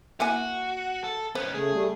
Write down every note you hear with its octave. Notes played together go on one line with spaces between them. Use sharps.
A#3 E4 F#4 G#5
A4
B3 C#4 C5
C#3 A3 G#4
G3 A3